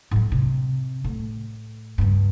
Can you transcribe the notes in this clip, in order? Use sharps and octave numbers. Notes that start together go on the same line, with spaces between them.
A2 F#3
C3
A2
C#2 G2